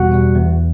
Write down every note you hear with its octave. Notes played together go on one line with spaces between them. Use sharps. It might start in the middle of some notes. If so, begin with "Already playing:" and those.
Already playing: E2 B2 G3 F#4 F#5
B2 G3
E2